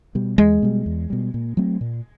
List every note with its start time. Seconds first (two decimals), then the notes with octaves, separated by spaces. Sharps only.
0.15 B2 G3
0.38 E2 G#3
0.62 B2 G3
0.86 E2
1.10 B2 G3
1.34 A#2
1.57 F#3 A3 C4
1.81 A#2